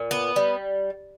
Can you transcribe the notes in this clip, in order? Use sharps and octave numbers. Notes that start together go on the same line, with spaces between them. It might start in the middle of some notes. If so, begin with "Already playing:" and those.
Already playing: A#2
B3
G3